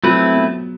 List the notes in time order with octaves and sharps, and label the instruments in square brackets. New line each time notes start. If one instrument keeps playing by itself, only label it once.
[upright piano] F#3 [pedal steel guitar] A3 C4 E4 B4
[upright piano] B3